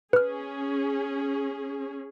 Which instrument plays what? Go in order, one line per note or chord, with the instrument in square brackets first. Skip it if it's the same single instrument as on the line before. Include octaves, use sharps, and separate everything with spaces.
[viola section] C#4 G#4 [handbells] B4 F6